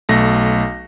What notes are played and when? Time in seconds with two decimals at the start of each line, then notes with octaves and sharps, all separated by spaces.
0.09 B1 A3 A#6